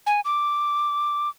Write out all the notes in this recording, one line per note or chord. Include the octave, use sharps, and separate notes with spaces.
G#5
D6